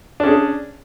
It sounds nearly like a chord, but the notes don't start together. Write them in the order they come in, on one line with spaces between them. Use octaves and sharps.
D4 C#4 G#4